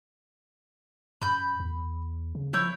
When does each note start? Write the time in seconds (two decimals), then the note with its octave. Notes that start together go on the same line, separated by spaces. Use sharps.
1.22 F#2 B5 G6
1.60 E2
2.35 C#3
2.53 F3 E4 C#5 G6